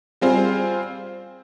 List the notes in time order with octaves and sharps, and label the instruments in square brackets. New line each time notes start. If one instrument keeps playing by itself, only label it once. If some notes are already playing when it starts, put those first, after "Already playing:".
[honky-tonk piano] G3 C4 F4 G#4 C5